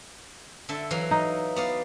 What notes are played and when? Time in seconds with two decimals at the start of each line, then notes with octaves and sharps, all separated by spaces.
0.69 D3 E5 A5
0.91 E3 F#3 F5
1.11 D#4
1.56 B3 D5 F5